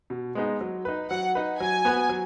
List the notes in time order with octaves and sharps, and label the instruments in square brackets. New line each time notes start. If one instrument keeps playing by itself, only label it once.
[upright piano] B2
G#3 B3 D#4
F#3
D#4 B4
[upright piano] F#3 [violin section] F#5
[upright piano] D#4 B4
[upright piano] F#3 [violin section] G#5
[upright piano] B3 F#4 B4
F#3